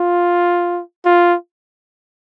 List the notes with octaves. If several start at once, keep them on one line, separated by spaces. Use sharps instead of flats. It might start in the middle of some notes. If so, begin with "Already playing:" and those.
Already playing: F4
F4